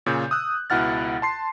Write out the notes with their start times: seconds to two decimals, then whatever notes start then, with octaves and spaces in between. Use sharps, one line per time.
0.06 A#2 C#3 G6
0.31 D#6 E6 F#6
0.70 C#2 B2 E4 F#5 F6 A6
1.22 A5 C6 C7